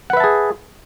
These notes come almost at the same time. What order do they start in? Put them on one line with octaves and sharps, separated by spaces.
F#5 B4 E5 A5 G#4